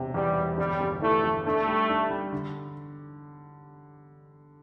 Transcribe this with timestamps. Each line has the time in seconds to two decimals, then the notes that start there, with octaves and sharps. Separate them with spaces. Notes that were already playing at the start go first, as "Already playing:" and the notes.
Already playing: E1 C3
0.14 E2 G3
0.37 E1
0.58 G1 G3
0.81 G1
1.02 E3 A3
1.24 G1
1.46 A3 D4
1.67 G3
1.89 D4
2.11 G3
2.32 D3